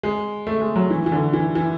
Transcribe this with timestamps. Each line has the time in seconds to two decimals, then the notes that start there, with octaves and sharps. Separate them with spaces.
0.03 G#3
0.47 A3
0.61 G#3
0.76 F#3
0.90 E3
1.06 E3
1.12 D3
1.33 E3
1.55 E3